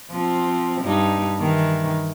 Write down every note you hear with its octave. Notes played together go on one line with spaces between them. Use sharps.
F3 C4
G2 D#4
D#3 E3